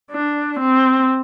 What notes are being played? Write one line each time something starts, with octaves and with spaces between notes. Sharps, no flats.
D4
C4